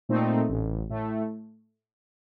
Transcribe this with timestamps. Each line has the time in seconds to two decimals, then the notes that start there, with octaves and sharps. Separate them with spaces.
0.09 A#2 A3 C4 D#4
0.49 A1
0.90 A2 A3